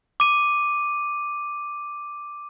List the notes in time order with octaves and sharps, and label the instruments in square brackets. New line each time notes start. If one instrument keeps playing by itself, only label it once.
[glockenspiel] D6 D#7